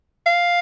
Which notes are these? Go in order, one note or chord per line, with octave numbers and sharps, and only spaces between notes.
F5